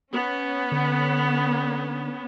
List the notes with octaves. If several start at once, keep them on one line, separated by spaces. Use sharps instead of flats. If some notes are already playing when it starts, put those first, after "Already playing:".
B3 C#4
D3